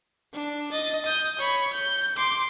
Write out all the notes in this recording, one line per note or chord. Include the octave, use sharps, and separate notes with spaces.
D4
D#5 A6
D#6 G6
C#5 B5
G6
C6 D6